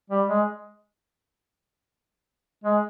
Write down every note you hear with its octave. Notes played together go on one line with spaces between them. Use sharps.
G3
G#3
G#3